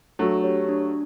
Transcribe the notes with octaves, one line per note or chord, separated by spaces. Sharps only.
F#3 A3 D4
G4 C#5
D4